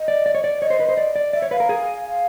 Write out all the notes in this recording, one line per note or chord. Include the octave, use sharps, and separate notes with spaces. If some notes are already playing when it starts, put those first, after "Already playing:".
Already playing: D#5
D5
D5
C#5
D5
C#5 D#5
C5
B4
C5
D5
D5
D5 E5
C#5
B4 F5
A#4
G#4
F5